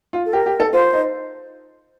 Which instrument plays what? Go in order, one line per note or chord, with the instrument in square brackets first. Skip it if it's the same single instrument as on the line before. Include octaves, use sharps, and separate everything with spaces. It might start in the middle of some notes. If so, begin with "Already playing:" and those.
[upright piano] F4
[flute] A4
[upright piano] G4 [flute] A#4
[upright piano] G4
A4
[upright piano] F4 [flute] C5
[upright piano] D#4